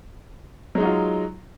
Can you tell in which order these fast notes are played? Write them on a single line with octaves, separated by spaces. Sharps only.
F#3 G#3 D#4 F#4 F4